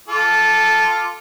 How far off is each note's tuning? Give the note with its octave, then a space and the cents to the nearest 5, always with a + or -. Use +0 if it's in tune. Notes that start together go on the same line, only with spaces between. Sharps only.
F4 +0 A4 -5 D6 +0